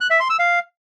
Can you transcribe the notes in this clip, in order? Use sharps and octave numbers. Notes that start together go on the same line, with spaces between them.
F#6
E5
C6
E6
F5